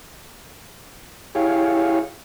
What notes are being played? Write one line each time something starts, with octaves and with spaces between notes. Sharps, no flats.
E4 G4 G#4 C#5 F5